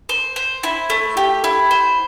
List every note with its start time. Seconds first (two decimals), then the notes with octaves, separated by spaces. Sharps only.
0.09 C5
0.36 C5
0.63 E4
0.90 A3
1.17 G4
1.44 E4
1.71 C5